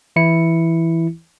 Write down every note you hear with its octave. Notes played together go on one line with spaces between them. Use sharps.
E3 E4 C#7